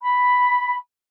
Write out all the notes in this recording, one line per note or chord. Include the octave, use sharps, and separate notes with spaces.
B5